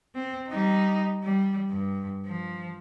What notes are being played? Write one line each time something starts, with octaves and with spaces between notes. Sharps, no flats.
C4
G3 D#4
G3
G2
F3